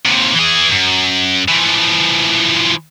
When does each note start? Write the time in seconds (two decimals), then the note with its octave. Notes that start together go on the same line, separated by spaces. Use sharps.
0.06 D#2 C3
0.35 E3 G#4
0.71 F#2
1.48 E3 F3